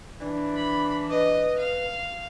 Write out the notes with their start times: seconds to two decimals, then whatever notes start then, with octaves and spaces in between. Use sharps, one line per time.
0.21 E3 D4
0.56 B5
1.10 B4 D#5
1.58 F5